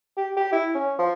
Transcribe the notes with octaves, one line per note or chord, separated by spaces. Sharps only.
G4
G4
E4
C#4
F3